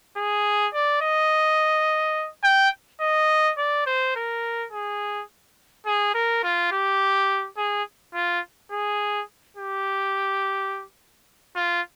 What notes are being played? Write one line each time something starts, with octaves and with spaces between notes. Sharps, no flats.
G#4
D5
D#5
G5
D#5
D5
C5
A#4
G#4
G#4
A#4
F4
G4
G#4
F4
G#4
G4
F4